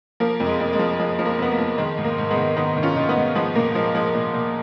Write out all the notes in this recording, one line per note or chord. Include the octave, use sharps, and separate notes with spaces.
F3 A#3
F2
G#3
F2
G#3
F3
F3 G#3
F3
A#3
F2 B3
A#3
F3
D#3 G#3
G#2
A#3
G#2
G#3 B3
D#3
D#3 B3 D#4
D#3
C#4 F4
D#3
B3 D#4
G#2
F3 G#3 B3
A#2 A#3
F3 G#3
F3 G#3
A#2
A#2